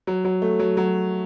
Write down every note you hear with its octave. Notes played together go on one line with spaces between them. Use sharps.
F#3
F#3
A3
F#3
F#3